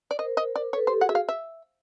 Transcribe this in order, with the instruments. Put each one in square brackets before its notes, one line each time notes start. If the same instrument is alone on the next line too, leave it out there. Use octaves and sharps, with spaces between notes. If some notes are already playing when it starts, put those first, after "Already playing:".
[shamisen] D5
[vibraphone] A#4 C5 [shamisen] D#5
[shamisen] D#5
D5
[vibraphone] A4 B4 [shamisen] C#5
[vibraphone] G4 A4 [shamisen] C5
[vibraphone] F#4 G#4 [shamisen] F#5
[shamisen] E5
F5
E5